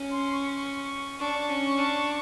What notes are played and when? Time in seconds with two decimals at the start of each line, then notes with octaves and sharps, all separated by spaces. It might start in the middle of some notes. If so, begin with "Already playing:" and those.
Already playing: C#4
0.11 C6
0.33 C#6
1.19 D4 C#6
1.49 C#4
1.78 D4